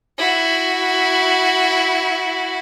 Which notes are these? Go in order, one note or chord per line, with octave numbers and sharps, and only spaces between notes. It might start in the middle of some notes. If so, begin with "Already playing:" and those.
E4 F#4